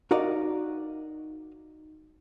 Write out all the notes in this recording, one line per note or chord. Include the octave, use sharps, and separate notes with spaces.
D#4 F#4 A#4 D5 D#5 F5